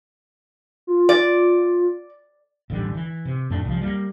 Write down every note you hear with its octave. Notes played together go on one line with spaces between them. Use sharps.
F4
D5
D#1 A1 D3 G3
E3
C3
F2 A2 A3 D4
C2 F3
G3 A3 A#3